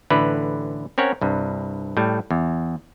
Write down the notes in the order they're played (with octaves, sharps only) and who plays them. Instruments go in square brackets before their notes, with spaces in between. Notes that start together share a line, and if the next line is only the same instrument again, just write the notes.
[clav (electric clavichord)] A1 D3 E4 B4
C4 C#4 A#4 C#5 F#5
C2 G2
A2 G3
E2